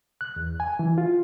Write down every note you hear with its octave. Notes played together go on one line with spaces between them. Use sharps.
F#6
E2
G#5
E3
F4